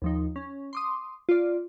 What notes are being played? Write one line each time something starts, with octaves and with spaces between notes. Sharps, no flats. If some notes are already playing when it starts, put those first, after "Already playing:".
D#2 F3 D#4
C#4
C6 D6 D#6
F4 D5